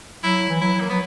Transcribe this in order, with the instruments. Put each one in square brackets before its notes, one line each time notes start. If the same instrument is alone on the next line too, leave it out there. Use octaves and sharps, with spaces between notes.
[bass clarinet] F#3 [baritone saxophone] E4
[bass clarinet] E3
[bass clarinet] F#3 [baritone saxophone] E4
[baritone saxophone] A#3
[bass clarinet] F#3 [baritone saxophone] B3